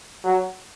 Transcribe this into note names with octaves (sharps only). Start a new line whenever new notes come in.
F#3